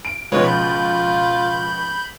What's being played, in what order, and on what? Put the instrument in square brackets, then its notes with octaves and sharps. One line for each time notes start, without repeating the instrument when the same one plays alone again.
[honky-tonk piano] D7
[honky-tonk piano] C#2 B2 F3 [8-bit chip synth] G#3 B4 C#5 [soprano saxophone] F4
[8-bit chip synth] B5 G6